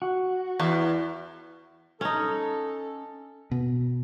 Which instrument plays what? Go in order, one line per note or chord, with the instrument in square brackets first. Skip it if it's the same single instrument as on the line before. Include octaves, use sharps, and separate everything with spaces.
[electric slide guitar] F#4
[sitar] E2
[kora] C#4 D#4 [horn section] A4
[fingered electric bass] B2